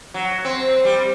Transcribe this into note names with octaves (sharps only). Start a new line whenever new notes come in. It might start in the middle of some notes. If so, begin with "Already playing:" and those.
F#3
C4
G3